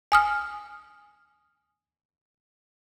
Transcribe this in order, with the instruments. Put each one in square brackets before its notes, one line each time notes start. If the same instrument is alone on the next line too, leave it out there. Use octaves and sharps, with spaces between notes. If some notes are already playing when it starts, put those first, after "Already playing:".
[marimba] G#5 D#6 F6